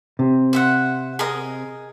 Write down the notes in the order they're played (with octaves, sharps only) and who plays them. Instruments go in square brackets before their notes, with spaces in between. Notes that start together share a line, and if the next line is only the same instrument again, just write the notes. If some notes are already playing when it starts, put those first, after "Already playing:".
[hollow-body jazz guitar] C3
[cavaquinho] C5 E5 F#5
G#4 A#4 D#5